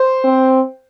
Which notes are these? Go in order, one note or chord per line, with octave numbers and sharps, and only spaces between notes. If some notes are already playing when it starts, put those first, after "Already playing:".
Already playing: C5
C4